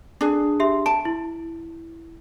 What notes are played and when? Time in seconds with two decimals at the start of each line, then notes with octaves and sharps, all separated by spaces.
0.21 D4 G#4
0.60 G4 E5 C6
0.86 A5 D7
1.05 E4